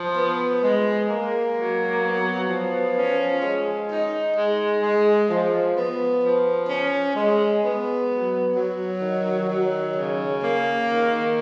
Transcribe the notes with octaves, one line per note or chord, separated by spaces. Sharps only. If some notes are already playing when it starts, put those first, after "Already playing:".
Already playing: F3
B3
G#3
A#3
F#3
B3
F3
C#4
G#3
D#4
G#3
G#3
F3
B3
F3
C#4
G#3
B3
F#3
F#3
D#3
F#3
C#3
A#3
D#3